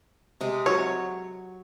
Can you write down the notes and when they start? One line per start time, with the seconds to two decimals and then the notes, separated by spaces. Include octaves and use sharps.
0.41 C3 G#3
0.66 F#3 C#5